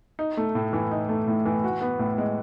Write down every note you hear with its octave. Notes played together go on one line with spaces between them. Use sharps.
D#4
A3
A2
E3
D#4
A3
A2
E3
F#4
B3
A2
G#3